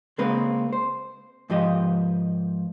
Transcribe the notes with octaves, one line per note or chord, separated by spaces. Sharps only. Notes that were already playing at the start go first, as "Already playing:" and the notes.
C#3 G#3 A#3 C4 B4
C5
G#2 F3 G4 D#5